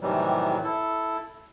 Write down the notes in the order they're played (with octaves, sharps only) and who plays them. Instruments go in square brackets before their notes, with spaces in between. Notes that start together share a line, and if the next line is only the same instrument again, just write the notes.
[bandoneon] A2 C3 D#3 E3 F#3 G3
E4 A4